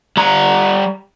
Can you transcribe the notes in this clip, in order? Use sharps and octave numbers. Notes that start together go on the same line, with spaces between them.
G3 A#5